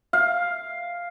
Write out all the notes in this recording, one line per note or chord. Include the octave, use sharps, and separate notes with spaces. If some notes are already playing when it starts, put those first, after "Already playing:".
F5